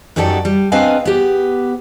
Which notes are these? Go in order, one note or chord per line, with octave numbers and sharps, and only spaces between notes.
F#2 F#3 D#4 G4 A4 D5
G3
C4 D4 B4 D#5 F5 G#5
B3 G4